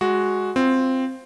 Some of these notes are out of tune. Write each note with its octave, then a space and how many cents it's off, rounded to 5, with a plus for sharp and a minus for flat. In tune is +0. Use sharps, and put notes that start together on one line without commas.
G#3 +0 F#4 +0
C4 +0 F4 +0